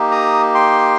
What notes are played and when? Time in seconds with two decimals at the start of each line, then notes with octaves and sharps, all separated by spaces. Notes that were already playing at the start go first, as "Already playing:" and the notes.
Already playing: A#3 D#4 G4
0.11 A#5 D#6
0.54 G5 C6